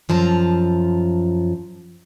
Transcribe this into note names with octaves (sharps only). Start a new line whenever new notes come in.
F#2 F3 A5 A#5